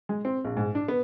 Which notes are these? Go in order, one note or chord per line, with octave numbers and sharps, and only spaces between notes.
G#3
C4
A#1
G#2
D4
B3